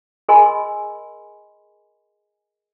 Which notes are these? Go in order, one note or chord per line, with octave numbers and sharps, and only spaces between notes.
G#4 A#4 D#5 G#5 B5 C6